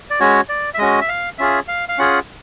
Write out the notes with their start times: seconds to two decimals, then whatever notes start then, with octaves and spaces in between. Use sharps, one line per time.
0.10 D5
0.20 G#3 C#4 F#4 C#5
0.49 D5
0.74 E5
0.79 G#3 C#4 F#4 D#5
1.01 E5
1.09 F5
1.38 C#4 F4 G#4 E5
1.68 F5
1.89 F5
1.98 C#4 F4 G#4 F#5